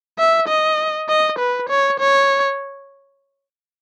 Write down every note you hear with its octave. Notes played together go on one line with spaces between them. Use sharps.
E5
D#5
D#5
B4
C#5
C#5